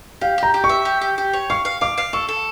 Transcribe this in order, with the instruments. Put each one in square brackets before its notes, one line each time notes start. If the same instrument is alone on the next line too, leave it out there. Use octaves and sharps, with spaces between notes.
[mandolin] G4 [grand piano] F5
[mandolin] G4 [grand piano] A#5
[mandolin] G4
[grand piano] C#6
[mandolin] E5
G4
G4
G4
C#5
[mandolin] F5 [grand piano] C#6
[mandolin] F5
[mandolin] F5 [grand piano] D6
[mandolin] F5
[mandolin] A4 [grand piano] C#6
[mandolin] A4